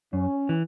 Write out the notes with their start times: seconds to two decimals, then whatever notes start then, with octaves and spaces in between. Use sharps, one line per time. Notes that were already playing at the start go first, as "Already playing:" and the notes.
0.13 F#2 C#4
0.49 E3